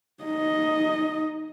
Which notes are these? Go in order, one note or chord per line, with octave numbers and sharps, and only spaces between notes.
D#4 D#5